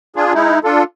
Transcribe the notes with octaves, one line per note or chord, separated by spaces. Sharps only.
D4 F4 G#4
G#3 D#4 E4
D4 F4 A4